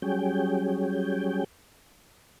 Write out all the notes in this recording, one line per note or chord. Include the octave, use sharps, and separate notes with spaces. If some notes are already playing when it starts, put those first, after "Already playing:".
F#3 G3 C#4 G#4 G5